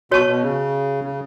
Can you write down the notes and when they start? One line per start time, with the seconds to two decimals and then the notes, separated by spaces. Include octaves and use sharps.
0.11 B2 F#4 C#5 A5 C#6
0.27 B2
0.42 C#3
1.04 C#3